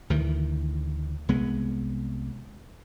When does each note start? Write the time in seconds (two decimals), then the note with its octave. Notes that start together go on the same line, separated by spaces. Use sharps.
0.10 D2 D#3 E3
1.29 C2 G#3 B3